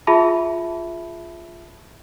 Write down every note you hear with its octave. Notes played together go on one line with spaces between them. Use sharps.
F4 G#4 E5 A5 B5